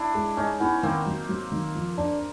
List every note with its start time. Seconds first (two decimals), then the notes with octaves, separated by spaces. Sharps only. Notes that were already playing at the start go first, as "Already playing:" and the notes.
Already playing: D4 E4
0.15 G#3
0.37 G#3 C#4 D#4
0.60 B3 C#4 E4
0.83 D#3 A#3 C4
1.06 F#3
1.29 F#3
1.52 D#3
1.75 F3
1.97 D4